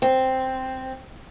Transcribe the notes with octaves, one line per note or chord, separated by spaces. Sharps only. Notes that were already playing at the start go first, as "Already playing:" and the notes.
C4